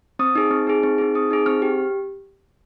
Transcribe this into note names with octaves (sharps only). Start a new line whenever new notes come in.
C4 D#6
D#4 G#4
C4
D#4 G#4
C4
D#4 G#4
C4 D#6
D#4 G#4
C4 F6
G4